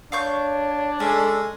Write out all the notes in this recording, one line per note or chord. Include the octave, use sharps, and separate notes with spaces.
D4 C#5 F5 C#6 G6
G#3 C#4 A4